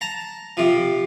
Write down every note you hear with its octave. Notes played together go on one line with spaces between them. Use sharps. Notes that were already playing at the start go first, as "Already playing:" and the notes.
A5 A#5
C3 F3